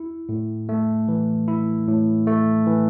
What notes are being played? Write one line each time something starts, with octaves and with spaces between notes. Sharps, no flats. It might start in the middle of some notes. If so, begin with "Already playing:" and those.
Already playing: E4
A2
A3
E3
E4
A2
A3
E3